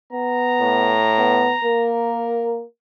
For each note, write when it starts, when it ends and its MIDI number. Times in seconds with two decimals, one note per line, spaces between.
0.13 0.98 59
0.13 1.95 82
0.61 1.48 45
1.18 1.54 59
1.65 2.64 58
1.65 2.57 70